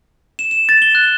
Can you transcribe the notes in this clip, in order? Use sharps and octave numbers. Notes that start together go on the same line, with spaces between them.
E7
E7
A6
G7
F#6